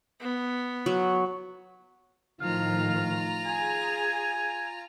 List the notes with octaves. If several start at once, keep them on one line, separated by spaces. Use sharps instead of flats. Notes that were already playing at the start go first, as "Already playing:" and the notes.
B3
F#3
A2 D#3 F3 F4 F5 A#5
G#4 G#5